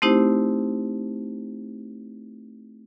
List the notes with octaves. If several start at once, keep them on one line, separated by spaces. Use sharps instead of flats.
A3 C4 D#4 E4 G4 C5